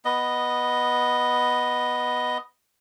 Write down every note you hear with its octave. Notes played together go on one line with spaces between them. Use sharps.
B3 D#5